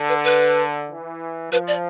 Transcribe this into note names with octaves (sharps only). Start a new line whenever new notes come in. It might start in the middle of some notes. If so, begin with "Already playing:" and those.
Already playing: D3
B4
B4
E3
F3 B4
D5